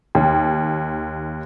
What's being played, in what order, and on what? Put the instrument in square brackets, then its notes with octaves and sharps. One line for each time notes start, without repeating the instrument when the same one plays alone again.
[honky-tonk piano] D#2